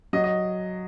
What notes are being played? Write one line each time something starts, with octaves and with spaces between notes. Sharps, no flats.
F#3 D#5
D#5